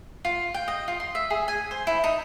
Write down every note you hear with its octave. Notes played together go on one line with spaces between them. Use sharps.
F4
G5
D#5
F4
C6
E5
G#4
G#5
C5
E4
D#4